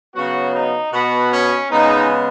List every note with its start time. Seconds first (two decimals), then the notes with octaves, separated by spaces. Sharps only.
0.15 C#3 F#3 B3 F#4
0.54 D#4
0.93 B2 B3 F#4
1.32 C#4
1.70 C#3 G#3 B3 D#4